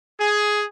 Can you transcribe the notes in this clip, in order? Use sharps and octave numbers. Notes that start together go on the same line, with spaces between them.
G#4